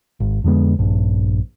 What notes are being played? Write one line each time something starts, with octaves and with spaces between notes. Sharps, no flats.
G#1
F2 D3 G#3 B3
A#1 G2